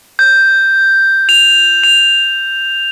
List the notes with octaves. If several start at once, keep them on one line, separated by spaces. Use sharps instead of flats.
G6
F7
F7